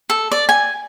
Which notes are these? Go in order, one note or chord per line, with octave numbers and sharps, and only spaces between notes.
A4
D5
G#5